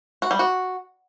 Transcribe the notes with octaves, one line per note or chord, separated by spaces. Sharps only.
F#4
G3
F#4